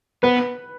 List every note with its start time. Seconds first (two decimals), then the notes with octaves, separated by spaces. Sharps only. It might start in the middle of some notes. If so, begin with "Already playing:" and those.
0.23 B3 B4